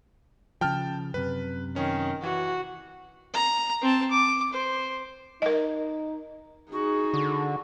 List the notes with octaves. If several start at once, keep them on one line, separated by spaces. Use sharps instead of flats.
C#3 F3 G5 A5 F6
F#2 C3 B4
D#3 C#4
E3 F#4
A#5
C4 A5
D6
C5
D#4 A#4 D#5
D#4 F#4 G#4
D3